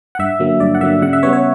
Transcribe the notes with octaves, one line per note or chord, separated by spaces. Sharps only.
F#5
G2 E5
D3 F#3 A#3
G2 D5
F#5
D3 F#3 A#3 E5
C#3 F#5
E5
G3 B3 C#5
C#5